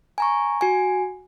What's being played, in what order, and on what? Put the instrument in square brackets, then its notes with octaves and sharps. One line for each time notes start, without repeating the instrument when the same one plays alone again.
[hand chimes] G#5 A#5 C#6
F#4 G#5